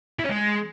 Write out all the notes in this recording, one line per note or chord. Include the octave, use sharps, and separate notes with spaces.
E4
C#4
G#3